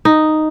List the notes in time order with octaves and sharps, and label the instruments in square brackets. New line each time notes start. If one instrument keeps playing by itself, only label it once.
[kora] D#4